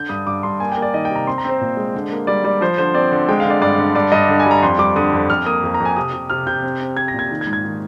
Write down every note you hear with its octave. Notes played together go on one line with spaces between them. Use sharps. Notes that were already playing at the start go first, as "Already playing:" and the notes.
Already playing: D3 G6
G2 D#6
G2 D6
G2 C6
A#3 G#5
G5
A#3
D5
D#3 D#5
G5
C3
A#5
C4 C6
A#5
C4 C5
A#2
G#3
D3
A#3
G3 D5
G3 D5
F3 C5
D3 C5
C4 D5
D3
G#3 G5
F5
D3
D5
G2 D5
D3
G2 D5
G2 D#5
D3
G#5
G3 A#5
F2 C6
G3 D6
D3 D#6
F2
F2 F6
A#3 D#6
F2
A#5
F2
G#5
C3 D#6
C3
C3 F6
C3 G6
C4
C4
C4 G#6
A#6
A#2 G#6
D#3
G#6
G#2
G#6
D#3